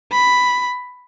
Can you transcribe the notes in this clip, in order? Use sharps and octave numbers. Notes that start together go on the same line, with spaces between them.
B5